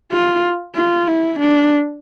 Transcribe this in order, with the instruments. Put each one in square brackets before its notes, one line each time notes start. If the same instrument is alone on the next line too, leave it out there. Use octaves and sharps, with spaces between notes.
[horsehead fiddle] F4
F4
E4
D4